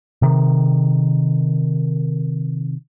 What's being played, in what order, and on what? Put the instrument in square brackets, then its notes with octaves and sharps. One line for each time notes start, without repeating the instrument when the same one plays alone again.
[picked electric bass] C3 D#3